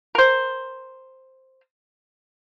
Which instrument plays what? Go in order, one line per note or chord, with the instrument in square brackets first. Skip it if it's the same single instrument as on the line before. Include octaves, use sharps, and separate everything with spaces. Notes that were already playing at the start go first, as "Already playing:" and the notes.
[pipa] A#4 C5